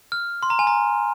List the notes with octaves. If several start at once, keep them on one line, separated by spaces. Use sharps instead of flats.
F6
C6
A#5
G#5
A#5